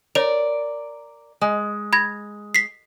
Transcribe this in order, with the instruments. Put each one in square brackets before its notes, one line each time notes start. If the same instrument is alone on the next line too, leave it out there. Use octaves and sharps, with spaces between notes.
[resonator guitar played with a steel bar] A#4 D5 [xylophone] C#5 F7
[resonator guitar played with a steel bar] G#3
[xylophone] B5 G#6 A#6
B6 C7